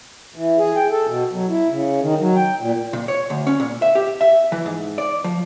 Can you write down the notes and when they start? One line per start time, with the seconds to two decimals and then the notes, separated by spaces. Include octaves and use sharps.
0.36 E3
0.58 G#4
0.76 G5
0.91 A4
1.07 B2
1.32 F#3
1.49 E4
1.69 C#3
2.01 D#3
2.20 F#3
2.36 G5
2.61 A#2
2.93 A#2
3.08 C#5
3.30 D2
3.47 C#4
3.60 A#2
3.82 E5
3.95 G4
4.21 E5
4.52 E3
4.66 G#2
4.98 D5
5.24 F3